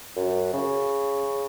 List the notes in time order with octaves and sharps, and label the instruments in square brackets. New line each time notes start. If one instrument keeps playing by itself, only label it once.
[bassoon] F#2
C#3